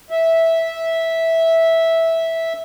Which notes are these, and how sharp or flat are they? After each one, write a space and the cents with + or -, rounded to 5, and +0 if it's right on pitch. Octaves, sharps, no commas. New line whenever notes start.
E5 -10